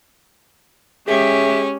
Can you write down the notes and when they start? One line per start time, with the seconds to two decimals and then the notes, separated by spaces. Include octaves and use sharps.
1.08 G#3 C#4 G4 G#4 E5